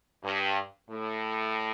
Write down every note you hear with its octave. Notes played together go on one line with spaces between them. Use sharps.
G2
A2